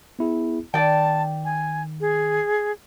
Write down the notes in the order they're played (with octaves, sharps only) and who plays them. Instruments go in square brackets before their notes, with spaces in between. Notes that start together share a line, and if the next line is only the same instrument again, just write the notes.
[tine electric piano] B3 E4 G#4
[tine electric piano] D#3 [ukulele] D5 G5 [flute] A5
[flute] G#5
G#4